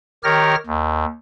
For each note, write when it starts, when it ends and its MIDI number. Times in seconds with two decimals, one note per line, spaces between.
0.24 0.55 51
0.24 0.55 67
0.24 0.55 70
0.24 0.55 73
0.24 0.55 89
0.24 0.55 94
0.66 1.05 39